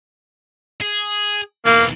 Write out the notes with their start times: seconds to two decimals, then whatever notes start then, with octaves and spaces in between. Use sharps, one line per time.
0.81 G#4
1.66 B1 E3 A#3